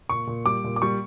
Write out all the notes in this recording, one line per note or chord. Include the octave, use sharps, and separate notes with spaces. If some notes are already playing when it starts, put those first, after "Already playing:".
A#2 C#6
A#2
G3 D6
A#2
D6
G3 C#6